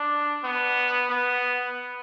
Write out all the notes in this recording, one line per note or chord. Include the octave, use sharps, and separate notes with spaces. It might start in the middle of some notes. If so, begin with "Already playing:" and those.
Already playing: D4
B3
B3